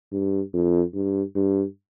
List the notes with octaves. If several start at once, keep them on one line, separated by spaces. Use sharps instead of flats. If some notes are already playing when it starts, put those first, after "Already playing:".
G2
F2
G2
G2